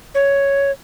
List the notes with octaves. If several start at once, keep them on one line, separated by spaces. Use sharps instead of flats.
C#5